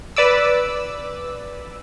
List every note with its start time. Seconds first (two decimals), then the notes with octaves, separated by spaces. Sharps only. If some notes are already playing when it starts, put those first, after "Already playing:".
0.16 B4 D5 D6 E6